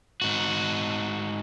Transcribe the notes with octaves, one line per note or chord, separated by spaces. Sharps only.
G#2 F#4